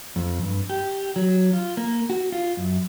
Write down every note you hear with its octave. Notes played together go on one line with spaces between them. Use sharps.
F2
G2
G4
F#3
F4
A#3
F#4
F4
F#2